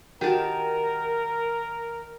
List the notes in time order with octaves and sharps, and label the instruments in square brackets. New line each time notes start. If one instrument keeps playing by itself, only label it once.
[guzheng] D#3 A5 [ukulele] F#4 G4 [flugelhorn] A#4